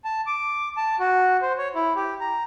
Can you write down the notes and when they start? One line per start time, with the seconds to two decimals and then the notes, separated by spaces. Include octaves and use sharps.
0.05 A5
0.27 D6
0.77 A5
1.00 F#4
1.42 C5
1.58 C#5
1.75 E4
1.96 G4
2.20 A#5